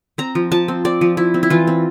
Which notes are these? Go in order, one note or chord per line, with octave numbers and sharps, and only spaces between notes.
C4 A#5
F3
F3 A5
C4
C4 D5
F3
F3 E4
C4
E4
E3 F4
C4